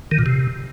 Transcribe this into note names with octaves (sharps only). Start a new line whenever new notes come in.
D#3
A#2
C3